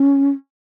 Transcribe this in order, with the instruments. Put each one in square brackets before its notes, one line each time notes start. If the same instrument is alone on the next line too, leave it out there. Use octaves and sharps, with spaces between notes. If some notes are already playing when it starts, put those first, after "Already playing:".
Already playing: [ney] C#4